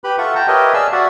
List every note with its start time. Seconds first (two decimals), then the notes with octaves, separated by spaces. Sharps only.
0.04 G4 B4 B5
0.18 F4 A4 E5 F#5 C#6
0.35 G5 A5 A#5
0.48 G4 A#4 B4 C#5 D#5 E5
0.74 G#4 D5 F5 G#5 A5 E6
0.93 F#4 D5 E5 F#5